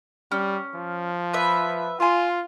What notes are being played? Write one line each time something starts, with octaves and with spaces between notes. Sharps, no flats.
G3 C#4
F3
B4 E5
F4 G#5 C6